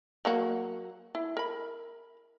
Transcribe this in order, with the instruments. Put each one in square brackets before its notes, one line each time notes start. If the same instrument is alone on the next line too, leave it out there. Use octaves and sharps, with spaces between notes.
[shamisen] F#3 A#3 F#4
E4
A#4 B5